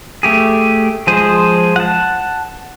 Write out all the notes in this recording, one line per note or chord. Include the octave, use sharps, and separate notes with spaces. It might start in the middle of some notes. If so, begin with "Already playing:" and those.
A3 G4 G#4
F3 G#3 G#4 C5
F#5 A5